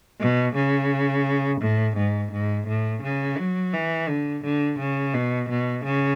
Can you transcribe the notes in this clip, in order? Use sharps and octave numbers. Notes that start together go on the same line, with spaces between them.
B2
C#3
A2
G#2
G#2
A2
C#3
F#3
E3
D3
D3
C#3
B2
B2
C#3